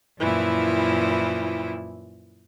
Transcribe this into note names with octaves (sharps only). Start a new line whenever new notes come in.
F#2 A#2 E3 F3 E4